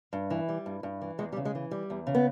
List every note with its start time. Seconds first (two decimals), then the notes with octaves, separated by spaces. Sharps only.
0.13 G2
0.30 E3
0.49 G3
0.66 G2
0.83 G2
1.02 E3
1.19 E2 G#3
1.33 G3
1.37 C#3
1.45 G#3
1.55 E3
1.71 G3
1.90 E2
2.07 C#3
2.15 B3